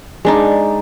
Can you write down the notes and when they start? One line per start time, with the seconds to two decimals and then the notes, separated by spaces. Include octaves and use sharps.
0.25 G#3 D4 D#4